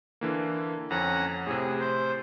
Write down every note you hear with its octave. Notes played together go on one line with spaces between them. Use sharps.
D3 E3 A#3
F2 C#4 F#5 A#5
A2 C3 G#4
C5